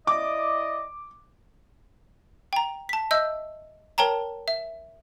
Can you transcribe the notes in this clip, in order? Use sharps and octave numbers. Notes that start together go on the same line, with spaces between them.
E4 D5 D#5 D6
G5 A#5
A5 B6
D#5 E5 E6 G6
A#4 C#5 G5 A5 A#5
E5